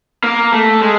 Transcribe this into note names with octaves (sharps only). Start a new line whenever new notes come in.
A#3
A3
G#3